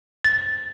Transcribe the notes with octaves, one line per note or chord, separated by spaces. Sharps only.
A6